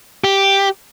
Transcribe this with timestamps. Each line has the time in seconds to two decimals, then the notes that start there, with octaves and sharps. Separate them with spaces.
0.24 G4